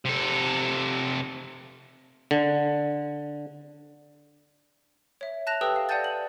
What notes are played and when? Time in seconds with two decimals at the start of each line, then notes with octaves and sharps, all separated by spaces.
0.06 C3 A4
2.31 D3
5.21 C#5 E5
5.47 A5 F#6 A#6 E7 F7
5.61 G4 A4 B4 G5 D#6 E6
5.76 F5
5.89 D5 F#5 G#5 A5 G6 A6
6.04 F#7